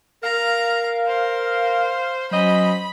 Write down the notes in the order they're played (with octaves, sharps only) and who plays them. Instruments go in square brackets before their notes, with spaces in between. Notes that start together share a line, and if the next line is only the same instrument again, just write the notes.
[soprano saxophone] A#4 [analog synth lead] F5 [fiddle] A#5
[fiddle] C5
[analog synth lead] F#3 [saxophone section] C#4 C5 D#5 [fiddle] B5